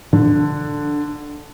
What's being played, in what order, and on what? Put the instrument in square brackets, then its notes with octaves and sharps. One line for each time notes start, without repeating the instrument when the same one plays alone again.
[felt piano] D3